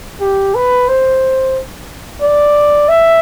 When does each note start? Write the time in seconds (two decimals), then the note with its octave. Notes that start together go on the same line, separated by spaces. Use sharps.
0.20 G4
0.55 B4
0.88 C5
2.22 D5
2.88 E5